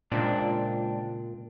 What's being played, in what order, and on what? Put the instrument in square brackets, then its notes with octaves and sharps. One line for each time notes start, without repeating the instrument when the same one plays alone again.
[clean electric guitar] C#2 C4 D4 [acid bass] A#2